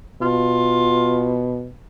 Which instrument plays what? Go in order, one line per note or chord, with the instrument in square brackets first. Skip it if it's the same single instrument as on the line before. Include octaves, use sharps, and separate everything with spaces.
[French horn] B2 [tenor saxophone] F4